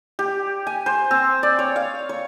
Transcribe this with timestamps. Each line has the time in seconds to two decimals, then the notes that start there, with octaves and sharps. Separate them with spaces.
0.19 G4
0.67 G#5
0.86 C5
1.11 C4
1.43 D5
1.59 C#5
1.76 F5
2.09 C#5